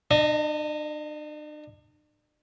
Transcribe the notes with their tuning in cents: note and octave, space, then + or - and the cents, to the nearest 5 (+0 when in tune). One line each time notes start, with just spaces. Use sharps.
D4 +45 D#5 +0